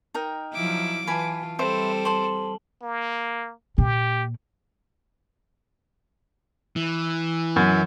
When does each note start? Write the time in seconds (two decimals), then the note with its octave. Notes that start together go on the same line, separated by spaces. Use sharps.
0.14 D#4 A#4 G5
0.54 F3 F#3 E4 D6
1.07 E3 F4 B4 G#5 A5 B5 D7
1.59 G3 C4 A4 B4 C5 E5
2.05 C5 A5 C6 F#7 G7
2.82 A#3
3.78 A#2 G4
6.76 E3
7.56 F#2